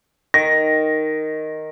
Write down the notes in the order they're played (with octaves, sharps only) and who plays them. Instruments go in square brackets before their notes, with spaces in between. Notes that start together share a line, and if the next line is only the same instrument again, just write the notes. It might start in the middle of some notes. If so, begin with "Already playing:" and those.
[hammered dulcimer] D#3 [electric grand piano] A#6